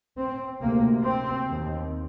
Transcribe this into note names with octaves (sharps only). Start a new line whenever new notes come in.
C4
D2 C3 A#3
C4
D#2